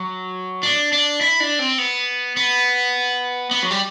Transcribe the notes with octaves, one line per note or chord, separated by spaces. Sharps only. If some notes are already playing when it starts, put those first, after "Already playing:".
Already playing: F#3
D4
D4
E4
D4
C4
B3
B3
B3
F#3
G3